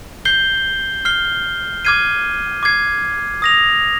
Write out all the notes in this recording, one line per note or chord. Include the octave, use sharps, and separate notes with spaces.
G6 C7 G7
F6 C7 G7
D6 F6 G#6 C7 D#7
D6 G#6 C7
D#6 A#6 F7